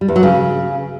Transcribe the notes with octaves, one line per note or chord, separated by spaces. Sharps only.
G3
E2
F#3
C#3